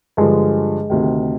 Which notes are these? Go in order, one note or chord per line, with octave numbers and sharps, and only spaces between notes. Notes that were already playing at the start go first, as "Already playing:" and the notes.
G2 D3 F3 G#3
D2 C3 D#3